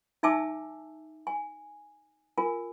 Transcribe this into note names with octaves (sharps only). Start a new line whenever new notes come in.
D#4 E5 G#5 A5 D6 E6
G#5
F4 A#4 G#5